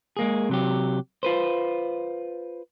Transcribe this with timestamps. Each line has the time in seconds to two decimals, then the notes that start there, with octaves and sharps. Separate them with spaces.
0.17 G#3 A#3 G#4
0.49 C3 F#3 G4
1.23 F4 B4 C5